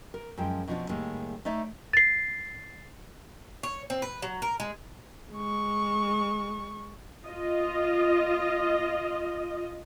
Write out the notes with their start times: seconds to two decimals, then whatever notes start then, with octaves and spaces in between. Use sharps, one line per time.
0.14 A#4
0.37 F#2 F3 G#3 G5
0.68 B2 F3 C#4 D4
0.89 A2 D#3 G3 G#3 A#3
1.45 A3 D#4 C#5 D5 E5
1.93 A6 C7
3.63 C#5
3.90 C4
4.02 B4
4.22 F#3
4.42 A#4
4.60 G#3
5.33 G#3 C#6
7.25 F4 D#5